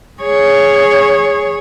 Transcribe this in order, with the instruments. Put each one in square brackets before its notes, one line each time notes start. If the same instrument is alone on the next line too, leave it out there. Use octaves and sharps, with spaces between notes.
[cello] G#4 C#5